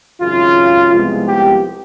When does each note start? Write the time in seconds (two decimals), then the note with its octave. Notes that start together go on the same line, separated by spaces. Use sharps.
0.20 G#1 F#2 C#3 F4
0.91 C2 C3 F3 G#3 B3
1.26 G4